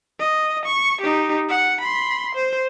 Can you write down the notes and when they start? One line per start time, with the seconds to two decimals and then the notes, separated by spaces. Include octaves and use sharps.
0.20 D#5
0.65 C#6
1.01 D#4 G4
1.49 F#5
1.81 B5 C6
2.35 C5